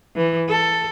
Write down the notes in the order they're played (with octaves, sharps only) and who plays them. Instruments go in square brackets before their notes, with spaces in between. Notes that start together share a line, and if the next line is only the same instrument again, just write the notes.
[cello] E3
A4